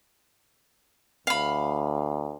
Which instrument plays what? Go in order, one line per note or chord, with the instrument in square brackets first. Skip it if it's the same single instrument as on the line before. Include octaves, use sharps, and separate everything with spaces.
[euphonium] D2 [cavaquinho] F5 B5